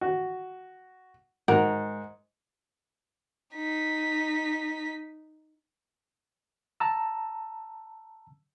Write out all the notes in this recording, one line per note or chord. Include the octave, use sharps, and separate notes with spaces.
F#4
G#2 F#4 A#4
D#4 B6
A5 A#5 E6